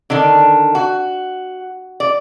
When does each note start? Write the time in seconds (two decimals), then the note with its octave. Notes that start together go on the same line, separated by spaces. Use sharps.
0.10 D3 D#3 D4
0.75 F#4
2.00 D5